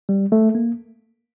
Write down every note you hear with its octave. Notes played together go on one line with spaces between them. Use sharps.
G3
A3
A#3